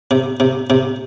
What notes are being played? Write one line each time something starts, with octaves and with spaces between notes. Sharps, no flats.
C3
C3
C3